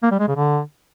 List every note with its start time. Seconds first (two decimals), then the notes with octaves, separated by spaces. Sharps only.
0.03 A#3
0.11 G3
0.20 G#3
0.28 C#3
0.36 D3